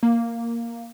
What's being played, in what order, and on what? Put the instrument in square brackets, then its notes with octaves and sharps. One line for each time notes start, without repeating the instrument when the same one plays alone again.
[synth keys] A#3